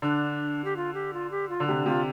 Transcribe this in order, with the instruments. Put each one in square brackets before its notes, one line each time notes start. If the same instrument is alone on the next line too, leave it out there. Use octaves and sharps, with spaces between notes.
[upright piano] D3 [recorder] D4
[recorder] G4
F4
G4
F4
G4
F4
[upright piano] D3
[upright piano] C3 [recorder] D4
[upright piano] C3 [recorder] F4